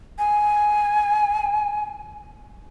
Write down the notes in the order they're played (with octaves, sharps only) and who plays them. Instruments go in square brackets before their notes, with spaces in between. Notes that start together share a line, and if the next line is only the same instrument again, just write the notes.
[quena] G#5